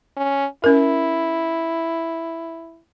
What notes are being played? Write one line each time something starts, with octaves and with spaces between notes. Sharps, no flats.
C#4
C#4 E4 A#4